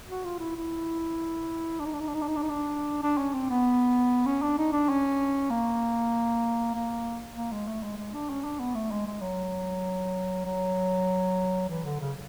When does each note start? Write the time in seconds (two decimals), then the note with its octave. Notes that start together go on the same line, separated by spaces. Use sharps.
0.09 F#4
0.25 F4
0.39 E4
0.56 E4
1.79 D4
1.85 D#4
1.93 D4
2.00 D#4
2.08 D4
2.14 D#4
2.22 D4
2.28 D#4
2.36 D4
2.42 D#4
2.49 D4
3.02 D4
3.18 C#4
3.34 C4
3.50 B3
4.26 C#4
4.42 D4
4.58 D#4
4.72 D4
4.89 C#4
5.50 A#3
6.75 A#3
7.37 A#3
7.52 G#3
7.67 A3
7.83 G#3
7.97 G#3
8.14 D4
8.30 C#4
8.44 D4
8.59 B3
8.75 A3
8.91 G#3
9.07 G#3
9.21 F#3
10.45 F#3
11.69 E3
11.85 D3
12.00 C#3